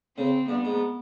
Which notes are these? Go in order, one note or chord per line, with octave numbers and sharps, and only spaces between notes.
C#3 C4
G2 B3
G#2